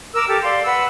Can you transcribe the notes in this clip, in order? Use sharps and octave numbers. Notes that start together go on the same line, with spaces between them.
A#4 D6 E6
G4 A4
D5 F5 C6
B4 F#5 E6